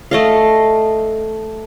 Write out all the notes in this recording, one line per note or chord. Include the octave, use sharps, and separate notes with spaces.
A3 D#5 F5